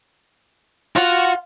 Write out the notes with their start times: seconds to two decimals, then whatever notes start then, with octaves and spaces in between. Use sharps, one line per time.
0.96 F4 F#4 F#5